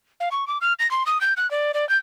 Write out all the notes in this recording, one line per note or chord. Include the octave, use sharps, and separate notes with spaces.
F5
C#6
D6
F6
A#6
C6
D#6
G6
F#6
D5
D5
G6